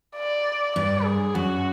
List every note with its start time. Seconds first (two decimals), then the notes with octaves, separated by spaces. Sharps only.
0.17 D5
0.76 G2 D5
1.05 G#4
1.35 F#2 F#4